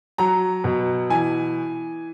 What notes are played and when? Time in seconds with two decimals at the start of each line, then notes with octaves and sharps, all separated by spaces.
0.18 F#3 A#5
0.64 B2
1.10 E3 G#5